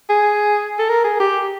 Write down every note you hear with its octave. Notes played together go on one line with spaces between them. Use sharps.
G#4
A4
A#4
G#4
G4